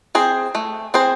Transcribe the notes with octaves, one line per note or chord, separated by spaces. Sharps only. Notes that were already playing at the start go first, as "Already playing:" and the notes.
C4 G#4 C5
A3
C4 G#4 C5